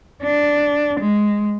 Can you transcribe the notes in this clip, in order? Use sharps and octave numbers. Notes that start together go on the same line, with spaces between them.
D4
G#3